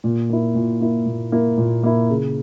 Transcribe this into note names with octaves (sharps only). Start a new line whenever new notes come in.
A#2
A#3 E4
A#2
A#3 E4
A#2
A#3 E4
A#2
A#3 E4
C#3